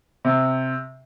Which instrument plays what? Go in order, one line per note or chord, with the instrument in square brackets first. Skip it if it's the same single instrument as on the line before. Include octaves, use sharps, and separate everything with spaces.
[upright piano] C3